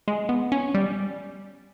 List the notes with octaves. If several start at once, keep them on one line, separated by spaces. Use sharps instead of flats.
G#3
B3
C#4
G3